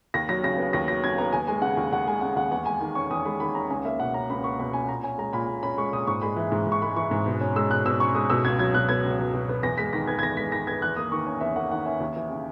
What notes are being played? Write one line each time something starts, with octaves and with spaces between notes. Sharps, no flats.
D#2 A#6
F#3 A#6
C#3 A#6
B3
D#2 A#6
F#3 A#6
C#3 G#6
B3 A#5
D#2 G#5
G#3 G#5
C#3 F#5
D#2
D#2 F#5
G#3 G#5
C#3 F#5
D#2 F#5
E2 F#5
G#3 G#5
D#3
C#4 C#6
E2 D#6
G#3 B5
D#3 B5
C#4 A#5
C#2 G#5
A#3 E5
B2 F#5
C#4 A#5
C#2 B5
A#3 C#6
B2 B5
C#4 G#5
A#2 A#5
C#4 G#5
G#3 A#5
A#2 B5
A#2
C#4 B5
G#3 C#6
A#2 D#6
G#2 C#6
G#3 B5
E3
G#2
G#2
C#6
G#3 B5
E3 C#6
G#2
B2
C#4
G#3 E6
B2 F#6
B2 E6
C#4 C#6
G#3 D#6
B2 E6
C#2 G#6
F#3 G#6
B2 F#6
B3 G#6
C#2
F#3
B2
B3
E2 A#6
G#3 B6
D#3 A#6
B3 G#6
G#6
E2 A#6
G#3 B6
D#3 A#6
B3 G#6
E2 F#6
A#3 D#6
D#3 C#6
C#4 G#5
E2 E5
A#3 F#5
D#3 F#5
C#4 E5
D#2
E3
C#3